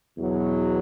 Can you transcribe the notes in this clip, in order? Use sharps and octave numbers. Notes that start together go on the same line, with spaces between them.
E2 B2 F#3